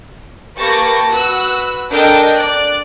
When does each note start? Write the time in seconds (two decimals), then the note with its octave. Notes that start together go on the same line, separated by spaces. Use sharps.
0.58 A#3 G4 B4 A5 C#6 A#6
1.12 F#4 B4 E6 F#6
1.90 D4 A4 A#4 D#5 G5 A5
2.35 D5 F#6